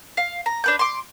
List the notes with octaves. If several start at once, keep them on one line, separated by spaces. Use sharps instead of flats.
F5
A#5
D4 B4 G6
C6 D6